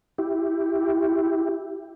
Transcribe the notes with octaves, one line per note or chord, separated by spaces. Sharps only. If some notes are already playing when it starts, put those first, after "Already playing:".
E4 G4